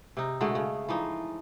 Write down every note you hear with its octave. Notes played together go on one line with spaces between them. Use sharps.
C3 D#4
B2 D3 G#3 A3
C#3
E3 F3 D#4